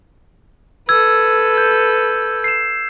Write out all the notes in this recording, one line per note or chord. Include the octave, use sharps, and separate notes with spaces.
A4 B4 E6 G#6
G6
C7 E7